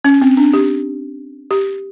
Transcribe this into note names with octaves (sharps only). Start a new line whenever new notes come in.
C#4
C4
D4
G4
G4